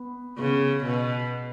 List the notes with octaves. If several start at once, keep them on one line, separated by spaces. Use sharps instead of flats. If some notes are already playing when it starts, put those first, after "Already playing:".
Already playing: B3
C#3 B3
B2